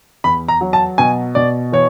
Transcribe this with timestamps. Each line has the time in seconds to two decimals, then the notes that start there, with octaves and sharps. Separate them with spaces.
0.24 E2 B5
0.48 A#5
0.61 F#3
0.73 A5
0.98 B2 G#5
1.35 B2 D5
1.72 E3 C#5